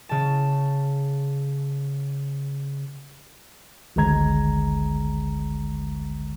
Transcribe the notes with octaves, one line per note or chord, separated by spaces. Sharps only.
C#3 A5
G#1 D2 D3 G#3 A#5 G#6